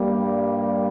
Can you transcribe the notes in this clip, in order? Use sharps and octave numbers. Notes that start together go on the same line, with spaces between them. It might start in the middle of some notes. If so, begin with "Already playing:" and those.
Already playing: G2 G3 A#3